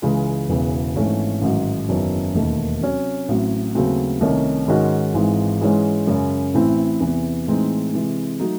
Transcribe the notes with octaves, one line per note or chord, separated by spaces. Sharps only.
C#2 C#3 E3 G#3
E1 E2 C#3 E3
G#1 G#2 E3 A3 C#4
A1 G#2 D#3 F#3
F#1 E2 D#3 F#3 C#4
E1 D#2 D#3 A3
C3 F#3 C#4
A1 A2 F#3 C4
D#2 C#3 F#3 A3 C4
C2 C3 D#3 A3 C#4
G#2 D#3 G#3 C#4 F#4
G#1 G#2 E3 G#3
G#2 E3 G#3 C#4
F#2 C#3 G#3 C#4
A1 A2 E3 C4 E4
E2 C3 E3
A2 E3 G#3 C4 D#4
C3 E3 G#3
F#3 A3 D#4